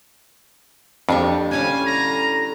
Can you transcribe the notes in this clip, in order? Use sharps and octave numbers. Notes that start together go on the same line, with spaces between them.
F2 D4 G4 C#6
A2 D3 G3 C#4 F5 G#5
A#5